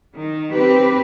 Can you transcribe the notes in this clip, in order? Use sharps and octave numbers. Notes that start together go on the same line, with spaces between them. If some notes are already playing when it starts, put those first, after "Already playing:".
D#3
C4 G4 B4